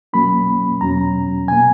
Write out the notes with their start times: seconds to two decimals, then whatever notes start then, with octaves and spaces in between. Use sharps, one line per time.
0.13 B2 F#3 A#3 C#4 B5
0.81 E2 B2 F#3 C#4 A#5
1.48 B2 A#3 G#5